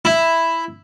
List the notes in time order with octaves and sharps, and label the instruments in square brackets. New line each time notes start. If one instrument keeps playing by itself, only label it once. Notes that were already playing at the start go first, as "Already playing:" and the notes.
[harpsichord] E4